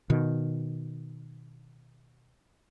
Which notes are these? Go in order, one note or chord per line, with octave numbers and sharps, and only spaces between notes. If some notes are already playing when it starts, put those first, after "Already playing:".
B2 D#3